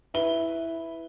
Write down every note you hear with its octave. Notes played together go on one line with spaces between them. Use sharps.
E4 B4 G7